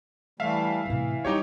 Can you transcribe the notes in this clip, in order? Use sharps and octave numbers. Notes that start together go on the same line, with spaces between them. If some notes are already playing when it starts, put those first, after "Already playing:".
E3 G3 A3 E5 F5
A2 C3 E3
G3 D#4 G4 C#5